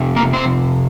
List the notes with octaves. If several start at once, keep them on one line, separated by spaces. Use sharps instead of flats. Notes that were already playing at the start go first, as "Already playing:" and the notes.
Already playing: F2 C3
A#3 A#4
C4 C5